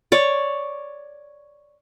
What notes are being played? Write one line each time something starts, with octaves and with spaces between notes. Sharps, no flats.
C#5 D5